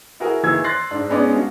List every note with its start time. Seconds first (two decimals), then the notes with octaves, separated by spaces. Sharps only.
0.20 E4 F#4 G#4 A#4
0.43 D#3 E3 A#3 G#4 E6 G#6
0.64 C6 F#6 A6 A#6 C7
0.91 G#2 D4
1.10 G#3 B3 C#4 D#4 B4 D5
1.32 G2 F#4